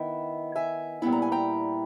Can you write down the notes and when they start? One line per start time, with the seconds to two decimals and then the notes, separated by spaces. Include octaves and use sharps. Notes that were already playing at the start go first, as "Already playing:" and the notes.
Already playing: D#3 B3 E4 G5
0.56 E5 G#5
1.02 A#2 G3 B3 E4
1.12 A#5
1.22 G#5
1.32 G5 A#5